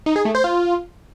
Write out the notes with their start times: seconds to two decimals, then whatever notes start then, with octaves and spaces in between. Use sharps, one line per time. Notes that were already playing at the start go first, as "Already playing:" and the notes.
0.06 D#4
0.16 G#4
0.25 A3
0.35 C5
0.44 F4